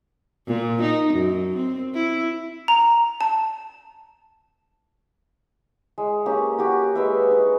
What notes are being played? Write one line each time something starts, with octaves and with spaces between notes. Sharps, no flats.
A#2
D#4
F#2
C4
E4
A#5
A5
G#3
A#3 C#4 G4
F#4 G4
G#3 B4 E5
D#4